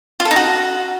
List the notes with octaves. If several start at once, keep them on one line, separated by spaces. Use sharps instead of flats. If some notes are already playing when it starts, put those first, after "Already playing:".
F4
A4
D#4
F#4